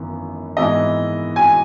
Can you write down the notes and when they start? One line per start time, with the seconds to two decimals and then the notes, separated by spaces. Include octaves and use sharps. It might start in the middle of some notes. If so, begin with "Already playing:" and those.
Already playing: G#1 F#2 E3 B3
0.57 G#2 E3 B3 E4 D#5
1.36 G#5